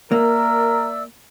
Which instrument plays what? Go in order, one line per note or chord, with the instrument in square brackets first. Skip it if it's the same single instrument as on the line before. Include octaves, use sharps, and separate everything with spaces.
[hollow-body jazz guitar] A#3 [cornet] A#4 [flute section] D5 E5 E6